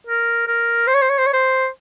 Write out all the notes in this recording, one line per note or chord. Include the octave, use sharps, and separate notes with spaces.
A#4
A#4
C5
C#5
C5
C#5
C5
C#5
C5